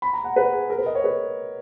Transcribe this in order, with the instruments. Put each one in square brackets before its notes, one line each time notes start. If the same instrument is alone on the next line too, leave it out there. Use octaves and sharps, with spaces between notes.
[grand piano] B5
A#5
F#5
B4
G#4
A#4
B4
D#5
C#5
B4